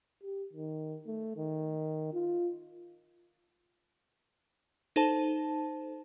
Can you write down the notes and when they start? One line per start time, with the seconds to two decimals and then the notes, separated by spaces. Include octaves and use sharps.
0.23 G4
0.53 D#3
1.06 A3
1.37 D#3
2.13 F4
4.96 D#4 A4 C5 A5